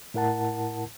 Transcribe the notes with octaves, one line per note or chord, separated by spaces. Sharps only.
A2 E4 A#4 F#5 A5